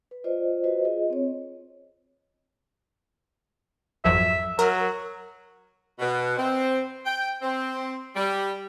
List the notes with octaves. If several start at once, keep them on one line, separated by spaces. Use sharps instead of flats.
B4
F4 C5 D5 D#5
F#4 B4 C5 D#5
F4 G#4 D#5
C4 C#5
G#1 F2 F#3 E5
F#3 A#4
B2
C4
G5
C4
G3